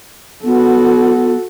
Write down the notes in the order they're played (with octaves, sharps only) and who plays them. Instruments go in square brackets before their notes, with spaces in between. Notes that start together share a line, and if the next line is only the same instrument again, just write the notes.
[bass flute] B3 [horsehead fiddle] F#4 A4